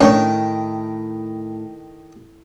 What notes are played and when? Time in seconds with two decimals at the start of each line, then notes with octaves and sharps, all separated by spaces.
0.01 A2 D#3 C#4 D4 C#5 G5